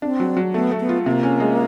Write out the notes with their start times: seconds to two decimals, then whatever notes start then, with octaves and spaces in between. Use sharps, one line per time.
0.02 C4 D4
0.20 F#3
0.37 F#3
0.53 A3 B3
0.71 A3
0.80 B3
0.89 F4
1.06 C3 A#3
1.23 C#4
1.40 G#3